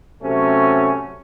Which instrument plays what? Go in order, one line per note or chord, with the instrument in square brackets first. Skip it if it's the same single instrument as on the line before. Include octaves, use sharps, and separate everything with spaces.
[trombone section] C3 F#3 A3 C#4